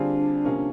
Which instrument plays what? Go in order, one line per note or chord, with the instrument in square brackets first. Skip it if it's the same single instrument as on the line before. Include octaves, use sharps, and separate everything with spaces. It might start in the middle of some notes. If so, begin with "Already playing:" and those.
Already playing: [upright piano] D3 G3 C4 F4 G#4 [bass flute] D4
[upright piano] C3 F3 A#3 C#4